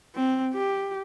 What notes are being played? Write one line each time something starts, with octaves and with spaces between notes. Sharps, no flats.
C4
G4